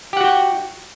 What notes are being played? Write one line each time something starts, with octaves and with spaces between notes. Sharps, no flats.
F#4 G4 F#5 G5